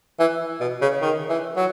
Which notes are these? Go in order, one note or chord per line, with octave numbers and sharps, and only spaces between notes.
E3
B2
C#3
D#3
E3
F#3